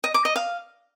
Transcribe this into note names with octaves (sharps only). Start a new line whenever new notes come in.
D#5
D6
D#5
F5